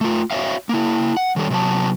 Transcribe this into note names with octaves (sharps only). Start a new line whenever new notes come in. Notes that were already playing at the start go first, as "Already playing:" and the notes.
A3 F4
F#4 C5 C#5 E5 F5
A#3 E4
F#5
D#3 G3 A4 C#5
C3 F#3 A5